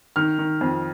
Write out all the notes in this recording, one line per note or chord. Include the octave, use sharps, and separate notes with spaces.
D#3 F6
D#3
F2